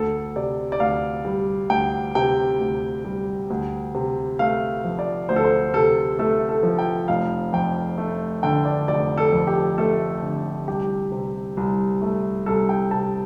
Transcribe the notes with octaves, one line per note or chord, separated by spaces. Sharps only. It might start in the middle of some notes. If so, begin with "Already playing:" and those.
Already playing: D2 A4
C3 D5
D5
D2 F5
G3
D2 G5
C3 G5
D2
G3
D2
C3
A3 F5
F3
D5
D2 C5
A4
C5
C3 A4
A3 A4
A4
F3
G5
F1 F5
F2 G5
A3
D3 G5
D5
F1 D5
A4
F2
G4
A3 A4
D3
C2 G4
C3
C2
A3
C2 A4
G5
C3 A5